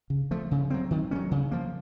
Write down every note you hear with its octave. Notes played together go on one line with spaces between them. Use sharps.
C#3
F3 A3
C#3
F#3 C4
D#3
F#3 A3 C#4
C#3
F3 A#3